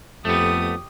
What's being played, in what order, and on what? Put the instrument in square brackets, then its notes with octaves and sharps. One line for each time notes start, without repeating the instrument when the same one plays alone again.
[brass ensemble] F2 [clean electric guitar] A3 B3 [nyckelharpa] G4 D#6